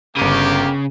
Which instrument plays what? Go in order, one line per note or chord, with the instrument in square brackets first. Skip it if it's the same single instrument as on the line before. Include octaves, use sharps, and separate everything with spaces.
[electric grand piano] G1 D6 D#7 [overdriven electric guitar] C#3 [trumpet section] A#3 G4